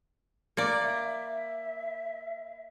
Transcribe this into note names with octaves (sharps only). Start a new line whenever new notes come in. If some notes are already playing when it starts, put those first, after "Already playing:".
A#3 D5
E5